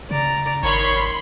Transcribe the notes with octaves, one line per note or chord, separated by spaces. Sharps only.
C#3 D5 A#5
G#1 D#3 C#5 B5 C6